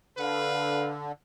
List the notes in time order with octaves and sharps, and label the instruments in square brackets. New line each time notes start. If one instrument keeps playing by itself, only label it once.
[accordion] D3 [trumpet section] B4 F5